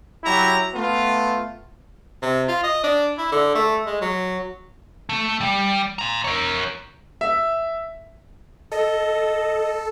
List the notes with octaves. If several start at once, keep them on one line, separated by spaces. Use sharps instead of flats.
F#3 E4 G4 A#5
A3 B3 F4
C3
F4
D#5
D4
E4
D3
A3
G#3
F#3
A3
G3
A#5 C6
A#4 C#5
E5
A4 D#5